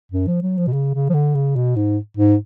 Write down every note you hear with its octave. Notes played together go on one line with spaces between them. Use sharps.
F#2
F3
F#3
F3
B2
C#3
C#3
F3
D3
C#3
B2
G#2
G#2